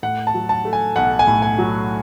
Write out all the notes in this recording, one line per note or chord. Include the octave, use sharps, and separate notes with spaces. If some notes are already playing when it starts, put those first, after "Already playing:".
A2 F#5
A5
F#3
A5
A3
G#5
B1 F#5
G#5
A2
G#5
F#3